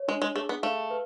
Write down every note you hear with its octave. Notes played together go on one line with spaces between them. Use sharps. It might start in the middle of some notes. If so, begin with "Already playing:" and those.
Already playing: C#5
G#3 D4
G#3
A3 G#4
B3
A3 F5
B4